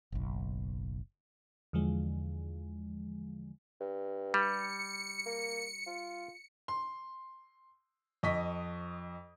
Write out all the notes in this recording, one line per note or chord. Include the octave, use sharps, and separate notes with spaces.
F#1 B1
E2 D3 F3 G#3
G2
G3 C#7
A#3
F4
C6
F2 D#5 C#6 D#6 B6